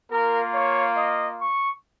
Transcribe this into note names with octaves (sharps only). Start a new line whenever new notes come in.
A#3 F4 A#4
C#5
D#5
C#6